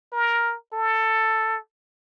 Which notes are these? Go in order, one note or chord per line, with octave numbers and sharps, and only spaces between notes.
A#4
A4